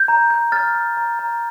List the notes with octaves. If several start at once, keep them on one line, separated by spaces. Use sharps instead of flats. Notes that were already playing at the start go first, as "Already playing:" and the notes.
Already playing: G6
A#5
G6
F6 A6
F6
A#5
A#5